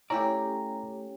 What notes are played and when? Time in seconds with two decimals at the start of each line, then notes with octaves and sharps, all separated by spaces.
0.10 A3 C#4 E4 G4 D5 A#5